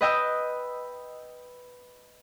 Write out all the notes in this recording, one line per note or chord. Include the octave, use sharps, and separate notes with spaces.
B4 D#5 G5 E6